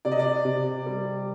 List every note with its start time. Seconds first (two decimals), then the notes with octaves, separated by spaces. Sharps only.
0.05 C3 D5
0.12 D#5
0.19 D5
0.45 C3
0.86 G3